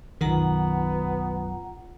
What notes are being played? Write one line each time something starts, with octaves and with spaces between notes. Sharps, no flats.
B1 F#2 D#3 B3 F4 F#5 A#5